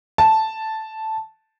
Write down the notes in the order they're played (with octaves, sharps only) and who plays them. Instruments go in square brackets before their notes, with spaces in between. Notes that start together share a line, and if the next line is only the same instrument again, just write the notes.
[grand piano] A5